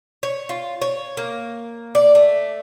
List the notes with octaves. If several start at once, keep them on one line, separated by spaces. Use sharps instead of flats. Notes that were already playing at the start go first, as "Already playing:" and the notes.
C#5
F4
C#5
A#3
D5
A3